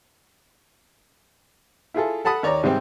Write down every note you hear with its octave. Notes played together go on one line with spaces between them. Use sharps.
E4 F4 G#4 A4
A4 F#5 A5 B5 D#6
D#2 C#5 D5 A#5
G#2 C3 G3 C4